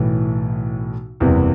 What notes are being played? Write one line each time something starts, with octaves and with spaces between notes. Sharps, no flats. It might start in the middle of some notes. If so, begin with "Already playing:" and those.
Already playing: B1 A2 E3
F#1 E2 C3 E3 G3